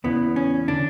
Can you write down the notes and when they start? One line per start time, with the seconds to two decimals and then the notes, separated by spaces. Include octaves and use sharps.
0.04 E2 C#3 E3 B3
0.36 C#4
0.68 D3 D4